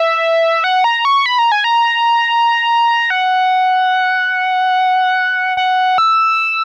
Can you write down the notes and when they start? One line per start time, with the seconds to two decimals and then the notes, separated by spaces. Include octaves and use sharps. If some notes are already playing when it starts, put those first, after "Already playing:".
Already playing: E5
0.64 F#5
0.84 A#5
1.05 C#6
1.26 B5
1.39 A#5
1.52 G#5
1.64 A#5
3.10 F#5
5.57 F#5
5.98 E6